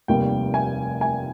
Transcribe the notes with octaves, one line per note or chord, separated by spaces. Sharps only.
F1 D#2 D#3 G3 G5
G#5
G#5